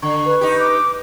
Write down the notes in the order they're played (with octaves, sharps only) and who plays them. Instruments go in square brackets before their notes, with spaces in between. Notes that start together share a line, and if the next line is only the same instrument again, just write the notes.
[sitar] D3 [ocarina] C#6
[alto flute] B4
[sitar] D#4 G4
[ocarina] D6